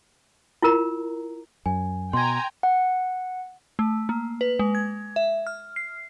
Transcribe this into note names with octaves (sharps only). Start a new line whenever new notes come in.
E4 F4 A#4 A#5
F#2 G#5
B2 G5 G#5 A#5 C6 G#6
F#5
A3
A#3
B4
G#3
G#6
E5
F6
C7